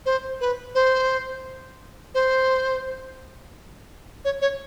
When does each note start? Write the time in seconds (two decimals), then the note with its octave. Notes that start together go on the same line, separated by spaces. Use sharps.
0.06 C5
0.41 B4
0.75 C5
2.15 C5
4.25 C#5
4.41 C#5